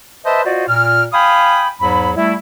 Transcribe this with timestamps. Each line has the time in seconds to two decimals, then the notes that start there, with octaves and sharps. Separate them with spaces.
0.25 B4 C5 D#5 E5 A5
0.45 F4 F#4 C5 D5 D#5
0.68 A#2 F6
1.13 F5 G5 G#5 B5 D#6
1.80 E2 G#2 F#3 B5
2.16 G3 A3 E4